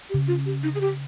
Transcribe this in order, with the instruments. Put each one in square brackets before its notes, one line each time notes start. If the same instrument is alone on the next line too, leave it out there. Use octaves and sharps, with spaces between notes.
[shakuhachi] G4
[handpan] C#3
[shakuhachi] F4
G4
D#4
G#4
G4